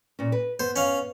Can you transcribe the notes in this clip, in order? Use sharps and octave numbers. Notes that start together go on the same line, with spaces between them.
A#2 C#4
B4
B3 C5
C#4 F5